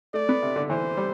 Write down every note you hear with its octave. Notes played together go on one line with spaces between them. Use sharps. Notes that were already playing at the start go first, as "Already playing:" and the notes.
A3 D5
B3
C3
D3
E3 C5
G3